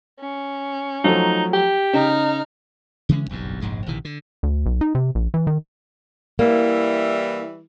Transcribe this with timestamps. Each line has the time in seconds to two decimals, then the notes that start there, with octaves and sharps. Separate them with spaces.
0.20 C#4
1.04 F3 F#3 A3 D#4
1.53 G4
1.93 C#3 D#4 F6
3.09 C#3 E3 G#3 C#4
3.29 F#1 B1 E2 G2
3.61 F1 A#1 G#2 G#3
3.87 A#1 C3 D#3 E3
4.05 D3
4.43 D2
4.66 B1
4.81 D#4
4.95 C3
5.15 A#1
5.34 E3
5.47 D#3
6.39 E3 G3 A#3 E4